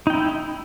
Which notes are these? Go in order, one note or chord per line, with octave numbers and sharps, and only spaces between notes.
D#4 E4 G5